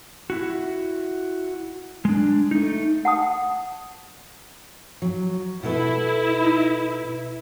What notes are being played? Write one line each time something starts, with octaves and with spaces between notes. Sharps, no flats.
E4 F#4
G#3 D4
A3 D#4
F#5 A5 D#6
F#3
B2 E4 A4 B4